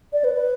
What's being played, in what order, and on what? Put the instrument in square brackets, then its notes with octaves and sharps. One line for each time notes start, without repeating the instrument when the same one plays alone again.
[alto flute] D5
B4
B4